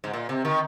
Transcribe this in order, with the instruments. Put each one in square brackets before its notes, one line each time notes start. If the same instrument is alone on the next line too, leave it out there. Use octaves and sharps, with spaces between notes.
[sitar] G#2
A#2
C3
D#3